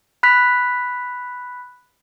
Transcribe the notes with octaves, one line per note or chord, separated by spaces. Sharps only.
B5 F#6 B6